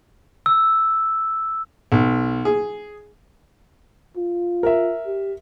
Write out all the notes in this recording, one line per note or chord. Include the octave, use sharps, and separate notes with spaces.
E6
B1
G#4
F4
A#4 E5
G4